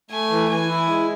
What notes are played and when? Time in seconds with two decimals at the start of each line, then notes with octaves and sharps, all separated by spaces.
0.10 A3 G#5
0.30 E3
0.49 E3 G#5
0.69 E4
0.88 G#3